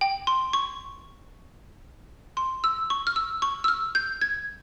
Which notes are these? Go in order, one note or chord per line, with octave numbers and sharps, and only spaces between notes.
G5
C6
C#6
C6
E6
C#6
F6
E6
C#6
E6
F6
G6
G#6